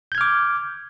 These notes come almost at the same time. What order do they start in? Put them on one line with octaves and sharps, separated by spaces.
G6 G#6 F6 D6